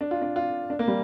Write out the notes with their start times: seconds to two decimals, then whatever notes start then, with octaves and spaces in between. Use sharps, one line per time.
0.01 D4
0.11 F4
0.22 D4
0.36 F4
0.70 D4
0.79 A#3
0.88 G3